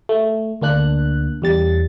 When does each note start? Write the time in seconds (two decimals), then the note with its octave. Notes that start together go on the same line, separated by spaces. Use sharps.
0.09 A3
0.62 D2 A#3 D4 F#6
1.42 E2 G3 A6